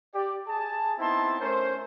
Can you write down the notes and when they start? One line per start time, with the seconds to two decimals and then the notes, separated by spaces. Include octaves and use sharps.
0.15 G4 D5
0.47 G#4 A5
0.99 B3 C4 D#4 E4 A5 C6
1.40 A3 C#4 A#4 C5